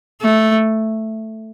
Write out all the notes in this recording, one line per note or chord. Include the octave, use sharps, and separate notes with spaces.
A3